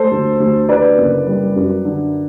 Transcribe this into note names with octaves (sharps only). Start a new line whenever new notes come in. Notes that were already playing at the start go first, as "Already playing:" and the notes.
Already playing: A3 A4 C5
D2
D2
D3 B4 D5
F#1
G3
F#2
D3